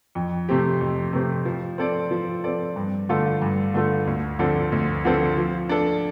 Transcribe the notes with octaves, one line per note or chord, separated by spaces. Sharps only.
F2
C3 A3 C4 G4
F2
C3 A3 C4 G4
F3
C4 A4 D5
F3
C4 A4 D5
G2
D3 A3 F4 A4
G2
D3 A3 F4 A4
D2
D3 F3 C4 A4
D2
D3 F3 C4 A4
F3
D4 A4